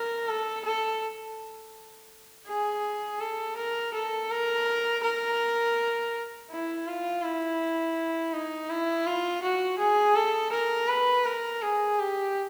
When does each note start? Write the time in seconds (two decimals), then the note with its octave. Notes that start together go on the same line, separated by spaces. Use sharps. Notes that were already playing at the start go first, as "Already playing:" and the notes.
Already playing: A#4
0.29 A4
0.65 A4
2.47 G#4
3.21 A4
3.57 A#4
3.94 A4
4.31 A#4
5.03 A#4
6.50 E4
6.87 F4
7.23 E4
8.33 D#4
8.70 E4
9.07 F4
9.42 F#4
9.79 G#4
10.15 A4
10.52 A#4
10.88 B4
11.25 A#4
11.62 G#4
11.99 G4